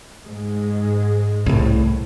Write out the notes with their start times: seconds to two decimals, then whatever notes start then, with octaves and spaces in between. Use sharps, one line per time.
0.24 G#2 G#3
1.46 C2 A2